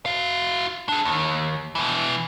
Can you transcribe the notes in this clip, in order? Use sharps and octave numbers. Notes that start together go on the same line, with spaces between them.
F#4 F5
D4 G#4
D#2
B2 E3